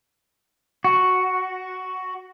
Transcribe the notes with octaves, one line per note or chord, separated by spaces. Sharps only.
F#4